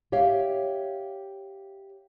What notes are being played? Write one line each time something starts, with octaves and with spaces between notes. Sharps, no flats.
G4 C#5 E5 F5